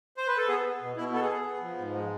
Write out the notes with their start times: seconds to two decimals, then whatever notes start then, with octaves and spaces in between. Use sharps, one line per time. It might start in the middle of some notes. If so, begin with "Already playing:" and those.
0.17 C5
0.27 B4
0.38 A4
0.48 B3 G#4
0.64 B3
0.81 B2
0.97 B2 E4
1.12 B3 A4
1.22 G#4
1.30 B3
1.45 B3
1.62 F3
1.78 G#2
1.94 G#3